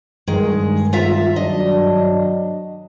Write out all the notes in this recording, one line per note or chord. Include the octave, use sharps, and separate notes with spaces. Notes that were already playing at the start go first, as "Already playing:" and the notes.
G2 D#3 G#3
F4 E5 A#5
F#3 D4 D#5